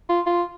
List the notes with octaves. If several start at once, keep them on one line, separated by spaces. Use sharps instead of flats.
F4
F4